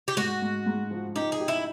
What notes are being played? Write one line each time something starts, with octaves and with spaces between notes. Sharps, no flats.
G4
G#2 F#4
G#2
G#2
F3
D#4 G4
G#4
G4
E4